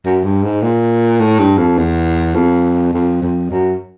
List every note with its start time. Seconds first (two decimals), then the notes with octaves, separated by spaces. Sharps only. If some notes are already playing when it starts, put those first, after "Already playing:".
0.05 F#2
0.24 G2
0.43 G#2
0.62 A#2
1.20 A2
1.39 G2
1.58 F2
1.78 E2
2.35 F2
2.93 F2
3.22 F2
3.50 F#2